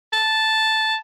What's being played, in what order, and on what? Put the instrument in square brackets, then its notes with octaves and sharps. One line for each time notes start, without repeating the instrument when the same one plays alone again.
[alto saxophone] A5